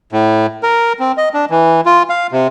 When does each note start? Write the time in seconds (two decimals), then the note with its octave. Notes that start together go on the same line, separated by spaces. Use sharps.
0.12 A2
0.63 A#4
0.99 C4
1.18 D#5
1.34 D4
1.50 E3
1.86 F4
2.09 F5
2.32 C3